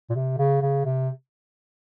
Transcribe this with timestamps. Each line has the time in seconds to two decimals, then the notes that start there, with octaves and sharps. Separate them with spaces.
0.10 A#2
0.15 C3
0.38 C#3
0.62 C#3
0.85 C3